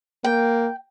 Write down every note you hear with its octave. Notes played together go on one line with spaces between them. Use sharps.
A#3 G5